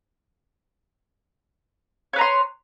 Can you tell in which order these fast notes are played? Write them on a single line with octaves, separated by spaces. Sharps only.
C#5 B4 A#5 C6